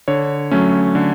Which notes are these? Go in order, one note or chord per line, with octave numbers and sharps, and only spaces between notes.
D3 C#5
F#3 A3 C#4
D3